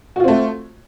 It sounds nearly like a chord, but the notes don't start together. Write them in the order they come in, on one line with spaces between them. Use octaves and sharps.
F#4 F4 C4 A3